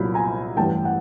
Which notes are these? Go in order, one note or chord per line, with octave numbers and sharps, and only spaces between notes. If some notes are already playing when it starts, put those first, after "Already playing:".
Already playing: C2 A#2 F#3 B5
G#5 A#5
A1 G2 E3 G5 A5
F#5